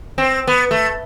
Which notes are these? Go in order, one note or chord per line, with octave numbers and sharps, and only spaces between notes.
C4
B3
A3